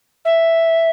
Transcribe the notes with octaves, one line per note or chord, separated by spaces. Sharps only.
E5